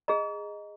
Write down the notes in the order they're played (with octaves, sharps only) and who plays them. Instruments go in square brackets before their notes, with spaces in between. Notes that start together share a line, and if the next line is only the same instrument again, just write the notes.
[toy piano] G#4 D#5 A#5